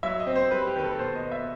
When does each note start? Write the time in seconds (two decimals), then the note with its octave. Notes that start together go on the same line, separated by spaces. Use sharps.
0.03 F#3 E5
0.20 D#5
0.27 C4
0.36 C5
0.51 G3 B4
0.67 G4
0.76 D#3 B4
0.84 A4
0.99 B2 C5
1.15 D#5
1.23 B3
1.32 E5